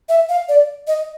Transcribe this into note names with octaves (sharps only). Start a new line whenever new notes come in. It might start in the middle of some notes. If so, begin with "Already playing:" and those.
E5
F5
D5
D#5